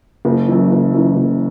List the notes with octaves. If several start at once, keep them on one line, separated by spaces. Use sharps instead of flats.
F#1
F#2 E3
F#1
F#2 E3
F#1